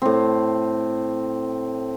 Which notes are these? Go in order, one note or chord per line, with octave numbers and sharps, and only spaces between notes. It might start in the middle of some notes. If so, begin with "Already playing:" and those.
A2 C4